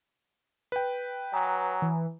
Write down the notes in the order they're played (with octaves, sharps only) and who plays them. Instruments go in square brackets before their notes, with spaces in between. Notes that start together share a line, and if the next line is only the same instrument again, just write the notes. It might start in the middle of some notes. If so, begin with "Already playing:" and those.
[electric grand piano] B4 G5
[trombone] F#3 [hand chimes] G#5 A#5 D#6
[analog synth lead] E3